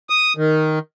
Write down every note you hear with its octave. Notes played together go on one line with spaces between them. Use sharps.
D#6
D#3